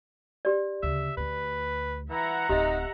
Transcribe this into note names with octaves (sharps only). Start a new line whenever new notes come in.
G4 D5
D2 C#3 E5
D2 A3 B4
E3 E5 F#5 A#5
D1 C4 D#4 G4 D#5